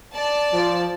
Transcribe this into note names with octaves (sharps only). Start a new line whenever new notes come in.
D5 A5
F3